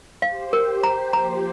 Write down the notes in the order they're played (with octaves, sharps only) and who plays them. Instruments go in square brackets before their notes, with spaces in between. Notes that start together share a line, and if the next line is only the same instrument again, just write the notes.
[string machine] G4 C5 [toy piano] F5
[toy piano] A#4
[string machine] G4 C5 [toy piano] A#5
[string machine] F3 A#3 [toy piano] A#5